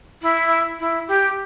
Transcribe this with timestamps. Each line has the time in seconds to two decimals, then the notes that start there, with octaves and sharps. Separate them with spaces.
0.22 E4
0.79 E4
1.08 G4